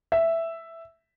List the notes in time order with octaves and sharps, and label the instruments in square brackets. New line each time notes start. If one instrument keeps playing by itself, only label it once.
[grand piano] E5